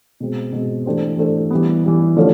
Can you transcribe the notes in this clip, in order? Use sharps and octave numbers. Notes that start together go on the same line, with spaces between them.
B2 G#3 C4
B2 G#3 C4
E3 A3 D4 G4 C5
E3 A3 D4 G4 C5
E3 G3 B3
E3 G3 B3
D3 F3 A3 C#4